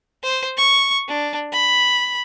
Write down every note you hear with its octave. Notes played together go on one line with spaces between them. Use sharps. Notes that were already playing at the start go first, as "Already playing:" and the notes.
C5
C#6
D4
B5